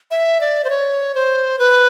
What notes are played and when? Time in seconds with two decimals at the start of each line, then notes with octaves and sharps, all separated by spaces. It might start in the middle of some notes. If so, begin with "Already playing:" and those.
0.11 E5
0.41 D5
0.64 C5
0.70 C#5
1.15 C5
1.59 B4